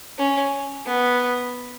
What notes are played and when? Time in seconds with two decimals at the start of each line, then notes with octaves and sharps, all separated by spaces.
0.18 C#4
0.86 B3